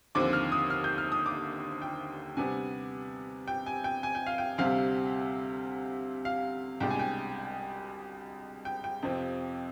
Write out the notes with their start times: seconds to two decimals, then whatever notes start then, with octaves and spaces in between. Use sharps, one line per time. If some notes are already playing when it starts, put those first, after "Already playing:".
0.15 D#2 D3 F3 C4 D6
0.33 F6
0.52 D#6
0.70 F6
0.84 G6
0.98 F6
1.12 D#6
1.26 D6
1.82 G5
2.37 C3 G3 B3 D4 G#5
3.48 G5
3.66 G#5
3.84 G5
4.03 G#5
4.15 G5
4.26 F5
4.38 G5
4.58 D2 C3 G3 C4 F5
6.25 F5
6.81 C2 B2 G#3 D4 G5
6.90 G#5
6.99 G5
8.65 G5
8.84 G5
9.02 F2 C3 F3 C4